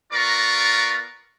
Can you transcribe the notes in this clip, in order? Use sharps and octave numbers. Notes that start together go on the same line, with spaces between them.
B3 F4 A#4 D5 A#5 C#6